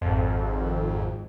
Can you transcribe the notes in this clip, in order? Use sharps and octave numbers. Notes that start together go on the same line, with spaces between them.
G#1 F2